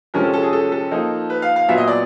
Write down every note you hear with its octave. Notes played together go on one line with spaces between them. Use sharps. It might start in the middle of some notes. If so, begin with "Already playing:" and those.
C3 F3 G#3 C#4 A#4
A4
A4
G#4
A4
A4
F3 A#3 D#4
B4
F5
F5
A#2 F#3 B3 E5
D#5
D5